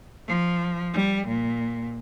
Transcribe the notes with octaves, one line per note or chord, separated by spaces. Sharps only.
F3
G3
A#2